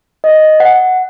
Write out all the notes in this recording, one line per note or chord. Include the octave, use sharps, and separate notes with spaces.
D#5
F#5